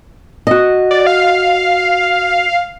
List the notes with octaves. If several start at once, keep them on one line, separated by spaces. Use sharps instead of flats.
F#4 D#5
D5
F5